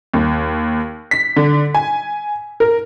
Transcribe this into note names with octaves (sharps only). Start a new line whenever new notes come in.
D#2
B6
D3
G#5
A#4